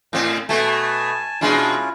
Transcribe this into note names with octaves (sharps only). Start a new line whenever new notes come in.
A2 C4 D#5 F5 G#5
B2 A3 G#5 A5
B2 G#3 C#4 D4 E4 F4